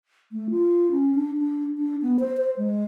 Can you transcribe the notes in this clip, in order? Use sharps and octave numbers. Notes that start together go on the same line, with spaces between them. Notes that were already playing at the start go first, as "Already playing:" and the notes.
A3
F4
C#4
D4
D4
D4
B3
C5
C5
G#3